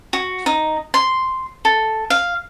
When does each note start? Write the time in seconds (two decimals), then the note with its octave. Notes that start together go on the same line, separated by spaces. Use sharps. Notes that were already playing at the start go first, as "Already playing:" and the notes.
0.13 F#4
0.46 D#4
0.94 C6
1.65 A4
2.10 F5